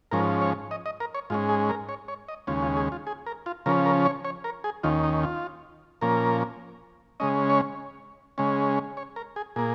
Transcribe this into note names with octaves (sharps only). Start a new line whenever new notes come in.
G#2 F3 C#4 A#4
C#5
D#5
D#5
A#4
C#5
G#2 G#3 C#4 F4
G#4
A#4
C#5
C#5
D#5
D#2 C#3 G#3 C#4 F4
F4
G#4
F4
G#4
A#4
F4
C#3 F3 C#4 A#4
A#4
C#5
C#5
A#4
G#4
D#2 D#3 C#4 F4
D#4
F4
A#2 F3 A#3 C#4 A#4
C#3 G#3 C#4 D#5
C#5
C#3 G#3 C#4
C#5
A#4
G#4
A#2 A#3 G#4